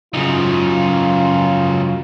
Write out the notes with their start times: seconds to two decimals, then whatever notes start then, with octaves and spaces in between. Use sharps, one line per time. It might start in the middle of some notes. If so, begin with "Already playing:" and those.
0.14 C#2 F#2 C#3 D#4 F4